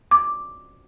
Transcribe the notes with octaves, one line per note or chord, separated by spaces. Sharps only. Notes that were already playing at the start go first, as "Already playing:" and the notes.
D6